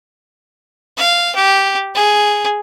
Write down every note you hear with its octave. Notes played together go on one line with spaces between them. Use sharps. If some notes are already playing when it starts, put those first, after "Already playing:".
F5
G4
G#4